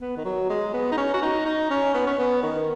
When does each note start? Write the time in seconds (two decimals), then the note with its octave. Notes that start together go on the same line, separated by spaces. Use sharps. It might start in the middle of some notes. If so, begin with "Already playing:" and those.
0.01 B3
0.17 D#3
0.25 F#3
0.50 G#3
0.74 B3
0.92 D#4
0.98 C#4
1.14 F#4
1.22 D#4
1.46 D#4
1.70 C#4
1.94 B3
2.07 C#4
2.19 B3
2.43 D#3